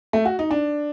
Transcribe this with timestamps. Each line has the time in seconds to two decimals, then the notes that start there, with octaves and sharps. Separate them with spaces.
0.13 A3
0.25 F#4
0.39 D#4
0.51 D4